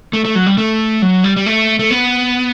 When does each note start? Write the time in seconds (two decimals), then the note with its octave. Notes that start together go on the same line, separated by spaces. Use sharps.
0.13 A3
0.25 A3
0.35 F#3
0.46 G3
0.58 A3
1.02 F#3
1.24 G3
1.37 G3
1.46 A3
1.79 A3
1.91 B3